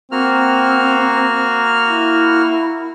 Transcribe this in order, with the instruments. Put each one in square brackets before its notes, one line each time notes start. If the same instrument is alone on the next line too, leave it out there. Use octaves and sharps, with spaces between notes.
[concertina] A#3 F#4 F6 [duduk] C4
[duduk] E4